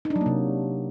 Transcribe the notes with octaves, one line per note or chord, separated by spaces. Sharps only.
D#4
D4
F#3
A#3
C3